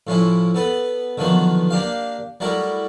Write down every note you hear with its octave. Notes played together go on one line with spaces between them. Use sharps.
A2 F3 C#4 E4
B3 A4 B4
D3 D#3 F3 F#3 B3
A#3 D4 G4 F5
F#3 G3 A3 E4 A#4